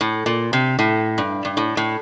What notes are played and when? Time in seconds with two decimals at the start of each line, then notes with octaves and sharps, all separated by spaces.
0.01 A2
0.26 A#2
0.53 C3
0.79 A2
1.18 G2
1.45 G2
1.57 A2
1.77 A2